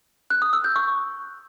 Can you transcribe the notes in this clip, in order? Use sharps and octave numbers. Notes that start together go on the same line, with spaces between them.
F#6
D#6
E6
G6
C#6